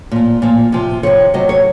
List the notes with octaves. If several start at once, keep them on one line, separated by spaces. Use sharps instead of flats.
A#2 F3
A#2 F3
C3 F3
C3 F3 C#5
C3 F#3 D#5
C#5